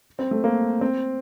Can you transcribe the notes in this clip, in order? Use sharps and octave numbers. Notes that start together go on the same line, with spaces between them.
C4
A3
A#3
C4